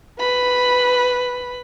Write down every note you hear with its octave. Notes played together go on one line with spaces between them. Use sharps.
B4 B5